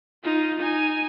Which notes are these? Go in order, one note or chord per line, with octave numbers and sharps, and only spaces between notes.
D#4 F4
D#4 G#5